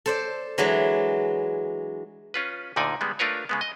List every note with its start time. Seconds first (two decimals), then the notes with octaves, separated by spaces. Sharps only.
0.06 A4 C5 D5
0.58 E3 F#3 G#3 D4
2.34 C#4 F4 B4
2.76 D2 A#2 D3 D#4 D5 G#5
3.01 G3 G#3 B3
3.19 A3 D4 F4 A#4 B4 C#5
3.49 C#3 G#3 B3
3.61 D#5